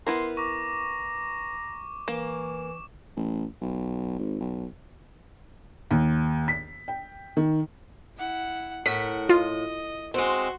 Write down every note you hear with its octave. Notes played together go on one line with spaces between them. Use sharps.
B3 E4 A#4 C6
A#5 C#6 D6
E3 A#3 E7
A1
B1
G#1
B1
D#2
B6
G5
D#3
E4 F#5
A2 A#4 F#5 B6
F4 D#5
G#3 C4 F#4 C6